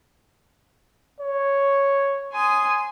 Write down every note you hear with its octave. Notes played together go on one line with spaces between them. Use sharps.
C#5
G#5 C6 D#6